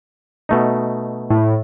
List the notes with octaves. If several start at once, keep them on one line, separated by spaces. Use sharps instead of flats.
B2 A3 D#4
A2